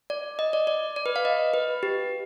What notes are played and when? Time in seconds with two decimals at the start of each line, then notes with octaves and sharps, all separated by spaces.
0.10 D5
0.39 D#5
0.53 D5
0.67 D5
0.96 D5
1.06 B4
1.16 F5
1.25 D#5
1.54 B4
1.83 G4